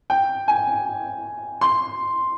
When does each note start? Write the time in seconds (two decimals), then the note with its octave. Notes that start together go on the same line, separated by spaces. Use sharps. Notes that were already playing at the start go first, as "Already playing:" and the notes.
0.10 G5
0.48 G#5
1.61 C6